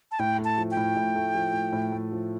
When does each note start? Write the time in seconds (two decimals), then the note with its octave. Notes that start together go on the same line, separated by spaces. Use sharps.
0.12 A5
0.19 A2 G5
0.38 A3
0.45 A5
0.58 F3
0.71 G5
0.77 A2
0.96 A2
1.16 A3
1.34 F3
1.53 A2
1.73 A2
1.92 A3
2.12 F3